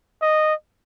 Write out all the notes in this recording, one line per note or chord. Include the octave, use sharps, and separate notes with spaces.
D#5